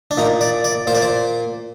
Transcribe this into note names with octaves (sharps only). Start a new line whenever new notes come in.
D4
A#2 D#4
D5
D5
A#2 C5
D5
C5